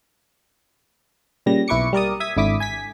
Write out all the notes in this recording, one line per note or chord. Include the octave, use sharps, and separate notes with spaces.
A#2 C#3 G3 A#6
B1 E4 B4 C#6 D6 C#7
G3 A#4 D5 D#6
E5 D#6 G#6 B6
G#1 D3 E4 D6 D#6 B6
G#5 G#6 B6